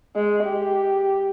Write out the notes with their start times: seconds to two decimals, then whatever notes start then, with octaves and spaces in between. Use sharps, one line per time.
0.16 G#3
0.45 G4